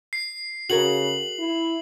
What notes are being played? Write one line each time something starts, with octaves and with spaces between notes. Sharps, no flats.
C7
C#3 F#4 G#4 A#4 F#7
E4